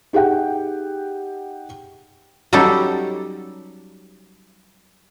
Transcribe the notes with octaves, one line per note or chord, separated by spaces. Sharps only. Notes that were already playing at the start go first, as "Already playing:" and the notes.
D#4 G4 G#4 F#5 G5
F#3 G3 C#4 D#4 G4 A4